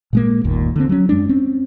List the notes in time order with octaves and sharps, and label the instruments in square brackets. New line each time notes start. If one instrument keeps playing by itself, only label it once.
[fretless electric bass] A#2 G#3 A#3
G1 D#2 A#2
D3 C4
F#3 C#4
F#2 G#3 D4
C4 C#4